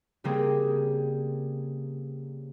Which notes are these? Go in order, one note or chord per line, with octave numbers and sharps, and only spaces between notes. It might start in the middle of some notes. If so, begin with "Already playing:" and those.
C#3 G3 A#3 C4 G#4